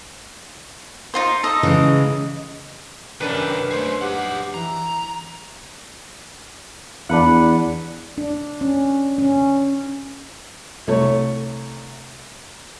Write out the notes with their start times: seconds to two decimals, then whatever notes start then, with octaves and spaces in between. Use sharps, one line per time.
1.14 D#4 F4 C5
1.44 D#4 A4 D#5
1.63 C#3 E3 G#3
3.20 F#2 C3 D#3 D4 A#4 B4
3.71 A3 G#4 C5
4.01 D#4 G4 F#5
4.54 E3 A#5
7.09 E2 D4 B4 F#5
8.18 D4
8.61 C#4
9.18 C#4
10.87 C2 A3 C#5